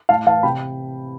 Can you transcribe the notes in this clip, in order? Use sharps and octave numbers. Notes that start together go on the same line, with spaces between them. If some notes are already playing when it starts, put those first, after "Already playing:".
A2 F5 A5
E3 F5 A5
C3 G5 B5